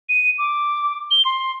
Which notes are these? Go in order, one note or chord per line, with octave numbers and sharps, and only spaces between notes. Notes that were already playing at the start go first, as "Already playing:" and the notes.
D#7
D6
G7
C6